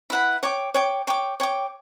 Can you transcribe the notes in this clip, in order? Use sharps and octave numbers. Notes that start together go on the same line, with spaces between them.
E4 B4 F#5 B5
C#5 G5 D6
C#5 G5 D6
C#5 G5 D6
C#5 G5 D6